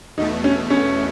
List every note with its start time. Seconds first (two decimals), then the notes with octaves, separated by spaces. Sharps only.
0.17 E2 B2 A3 D#4
0.44 C#4
0.70 C#4